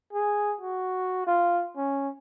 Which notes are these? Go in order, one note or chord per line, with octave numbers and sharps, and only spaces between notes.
G#4
F#4
F4
C#4